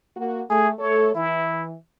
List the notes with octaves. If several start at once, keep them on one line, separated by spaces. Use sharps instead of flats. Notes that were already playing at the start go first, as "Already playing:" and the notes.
A#3 F#4
A3 G#4
A3 A4 C#5
E3 E4